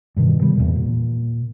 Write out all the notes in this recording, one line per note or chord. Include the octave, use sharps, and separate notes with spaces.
G2 B2 D#3 E3
C3 D#3 G3 B3
E2 A#2
A#2